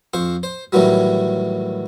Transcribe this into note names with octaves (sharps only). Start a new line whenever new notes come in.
F2 C5 C#6
C5
A2 D#3 E3 F#3 G3